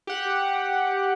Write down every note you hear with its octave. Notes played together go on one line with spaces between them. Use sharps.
G4 F#5